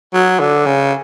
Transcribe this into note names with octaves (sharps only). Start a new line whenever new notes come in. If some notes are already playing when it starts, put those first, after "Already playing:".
F#3
D3
C#3